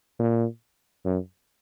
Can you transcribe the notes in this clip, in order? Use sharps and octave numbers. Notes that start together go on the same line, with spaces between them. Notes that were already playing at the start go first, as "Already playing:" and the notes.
A#2
F#2